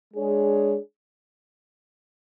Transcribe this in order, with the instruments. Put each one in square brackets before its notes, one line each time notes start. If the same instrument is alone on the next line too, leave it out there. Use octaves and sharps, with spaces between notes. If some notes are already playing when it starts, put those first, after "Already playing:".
[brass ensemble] G#3 D4 G#4 C#5